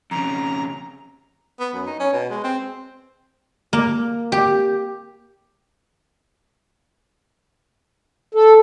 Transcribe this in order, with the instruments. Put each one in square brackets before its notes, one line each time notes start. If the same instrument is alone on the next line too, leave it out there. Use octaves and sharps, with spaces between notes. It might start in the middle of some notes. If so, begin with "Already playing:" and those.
[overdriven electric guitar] F2 C#3 [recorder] A#5
[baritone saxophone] B3
F#2
D#4
C#4
B2
G#3
C4
[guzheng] A#3
G4
[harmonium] A4